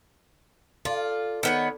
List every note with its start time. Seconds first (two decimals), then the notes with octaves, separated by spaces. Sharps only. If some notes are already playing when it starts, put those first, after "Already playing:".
0.85 F4 A4 D5
1.43 D#3 B3 C#5